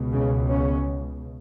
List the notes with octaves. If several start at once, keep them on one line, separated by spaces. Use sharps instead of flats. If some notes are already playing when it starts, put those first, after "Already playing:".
Already playing: C#2 B2
C#3
C#4